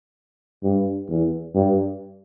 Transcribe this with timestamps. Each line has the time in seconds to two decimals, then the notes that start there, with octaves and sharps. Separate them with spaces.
0.64 G2
1.09 E2
1.55 G2